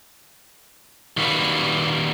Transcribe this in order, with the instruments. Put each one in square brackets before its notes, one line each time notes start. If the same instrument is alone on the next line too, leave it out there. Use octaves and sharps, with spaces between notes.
[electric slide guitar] D#3 G3 A#3 F#4 B4